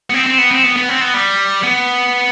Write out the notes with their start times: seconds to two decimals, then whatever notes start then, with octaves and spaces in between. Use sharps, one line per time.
0.10 B3
0.14 C4
0.26 C4
0.38 B3
0.51 C4
0.64 B3
0.76 B3
0.89 C4
1.01 B3
1.14 G3
1.64 B3